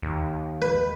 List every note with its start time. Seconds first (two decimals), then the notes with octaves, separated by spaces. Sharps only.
0.02 D#2
0.62 B4